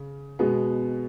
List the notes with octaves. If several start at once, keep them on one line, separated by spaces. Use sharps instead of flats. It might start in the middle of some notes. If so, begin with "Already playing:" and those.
Already playing: C#3
B2 G#3 B3